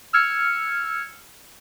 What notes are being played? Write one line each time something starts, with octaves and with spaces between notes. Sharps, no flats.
E6 F6 G#6 C#7